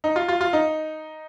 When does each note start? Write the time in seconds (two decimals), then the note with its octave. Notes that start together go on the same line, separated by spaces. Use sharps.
0.04 D#4
0.16 F4
0.28 F4
0.41 F4
0.53 D#4